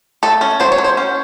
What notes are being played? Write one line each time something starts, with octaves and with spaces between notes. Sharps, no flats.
A3 A4
C#4
F#3 C5
C#5
F#3
C5
C#4